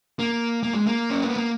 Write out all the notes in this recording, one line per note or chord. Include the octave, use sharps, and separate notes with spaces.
A#3
A#3
G#3
A#3
C#4
B3
A#3